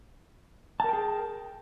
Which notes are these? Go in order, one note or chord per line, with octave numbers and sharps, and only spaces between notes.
G#4 A#4 G5 A5